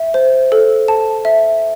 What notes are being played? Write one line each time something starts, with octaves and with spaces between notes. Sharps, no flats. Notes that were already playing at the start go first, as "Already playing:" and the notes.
Already playing: E5
C5
A4
A5
E5